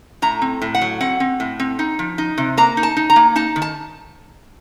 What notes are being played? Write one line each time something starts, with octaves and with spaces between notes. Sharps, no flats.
A2 A#5
C4
A2
F#5
F#3
C4 F#5
C4
A2
C4
D#4
F3
D#4
C3
A#3 A#5
D#4
A5
D#4
A#5
A#3
D#4 A5
D#3
A5